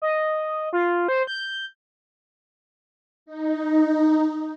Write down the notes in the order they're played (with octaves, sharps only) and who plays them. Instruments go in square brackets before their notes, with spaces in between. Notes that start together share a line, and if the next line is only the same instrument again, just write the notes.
[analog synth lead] D#5
F4
C5
G6
[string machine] D#4